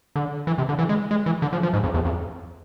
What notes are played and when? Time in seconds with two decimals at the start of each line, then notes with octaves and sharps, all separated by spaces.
0.16 D3
0.47 E3
0.58 C3
0.69 D3
0.79 E3
0.89 G#3
1.11 G#3
1.26 E3
1.42 D3
1.53 F3
1.63 F3
1.73 G#2
1.83 F2
1.94 E2
2.05 F2